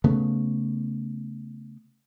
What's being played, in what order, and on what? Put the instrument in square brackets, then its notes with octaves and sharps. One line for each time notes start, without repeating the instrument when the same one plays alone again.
[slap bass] C#3 A3 B3